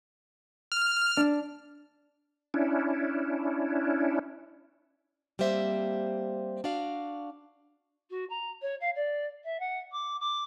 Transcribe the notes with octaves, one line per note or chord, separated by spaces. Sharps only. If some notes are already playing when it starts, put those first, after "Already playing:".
F6
D4
C#4 D4 E4
G3 A#3 C4 C5 E5
D4 F#4 D5 F5
F#4
A#5
C#5
F5
D5
E5
F#5
D6
D6